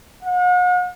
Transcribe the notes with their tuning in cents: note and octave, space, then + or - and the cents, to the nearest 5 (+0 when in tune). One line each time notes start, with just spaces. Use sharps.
F#5 -45